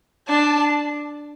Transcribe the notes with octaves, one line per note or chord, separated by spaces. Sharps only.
D4 A5